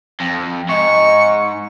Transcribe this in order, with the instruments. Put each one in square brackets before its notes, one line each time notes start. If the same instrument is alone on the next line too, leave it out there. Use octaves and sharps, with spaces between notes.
[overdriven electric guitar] F2
[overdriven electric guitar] G#2 [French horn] D#5 [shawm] C#6